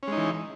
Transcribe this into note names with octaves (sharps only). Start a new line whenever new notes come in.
E3 G#3 C#4 D#4